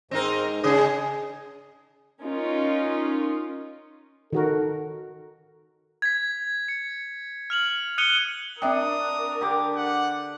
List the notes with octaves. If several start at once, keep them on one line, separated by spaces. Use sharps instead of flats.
G#2 C4 D#4 A#4
C#3 G#4 D#5
C#4 D#4 F4 A#4
D#3 F#4 A4 A#4
G#6 B6
C#7
F6 F7 F#7
D#6 F#6 C#7 D#7 F7 G7
C4 D4 A#4 E5 G5 D#6
D3 G4 D6
F#5